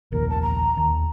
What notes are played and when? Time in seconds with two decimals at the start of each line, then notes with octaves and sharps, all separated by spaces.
0.12 F1 A#1 D#2 A#4
0.30 A5
0.42 A#5
0.77 D#2